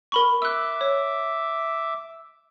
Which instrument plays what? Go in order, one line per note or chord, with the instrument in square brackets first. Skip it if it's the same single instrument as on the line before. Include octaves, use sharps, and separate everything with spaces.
[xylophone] A#4 B5 C#6
[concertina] E5 D6 [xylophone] E6 F#6
[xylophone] C#5